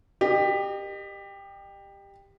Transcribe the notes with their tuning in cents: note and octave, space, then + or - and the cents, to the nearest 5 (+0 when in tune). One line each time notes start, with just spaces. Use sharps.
G4 +15 A#4 +0 D#5 -35